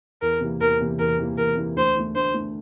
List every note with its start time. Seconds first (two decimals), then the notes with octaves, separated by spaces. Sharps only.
0.22 E2 A#4
0.41 C3 E3 A#3
0.61 E2 A#4
0.80 C3 E3 A#3
0.99 E2 A#4
1.19 C3 E3 A#3
1.38 E2 A#4
1.57 C3 E3 A#3
1.76 D2 C5
1.96 D3 A3
2.15 D2 C5
2.34 D3 A3